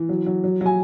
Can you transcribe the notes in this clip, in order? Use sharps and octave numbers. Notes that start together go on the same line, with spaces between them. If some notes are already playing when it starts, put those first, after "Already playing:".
Already playing: E3
F#3
F#3
F#3
F#3 G#5